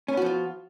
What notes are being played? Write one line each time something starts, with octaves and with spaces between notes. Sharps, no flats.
F3 B3 C#4 F4 F#4